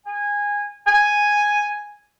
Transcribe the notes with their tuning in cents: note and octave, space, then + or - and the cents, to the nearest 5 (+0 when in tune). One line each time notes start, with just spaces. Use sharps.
G#5 -20
G#5 +0